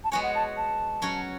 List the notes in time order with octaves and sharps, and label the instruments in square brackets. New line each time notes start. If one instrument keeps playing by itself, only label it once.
[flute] A5
[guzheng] G#3 B3 F#4 C#5 [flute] G#5
[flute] F#5
A5
A5
[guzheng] F#3 C#4 F#4 C#5